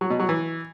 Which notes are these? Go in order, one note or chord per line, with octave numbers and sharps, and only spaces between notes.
F#3
B2
F#3
E3